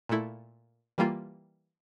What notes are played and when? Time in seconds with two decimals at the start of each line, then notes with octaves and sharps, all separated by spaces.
0.09 A#2 A3 E4
0.98 E3 G3 A#3 F4